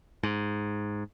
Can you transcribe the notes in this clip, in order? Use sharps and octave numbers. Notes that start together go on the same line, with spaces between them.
G#2